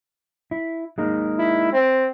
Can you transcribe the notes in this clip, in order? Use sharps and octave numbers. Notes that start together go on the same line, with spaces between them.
E4
G#3 A#3 D#4
E4
C4